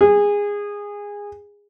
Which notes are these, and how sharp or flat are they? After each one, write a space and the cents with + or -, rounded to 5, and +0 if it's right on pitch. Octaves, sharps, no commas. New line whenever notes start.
G#4 -20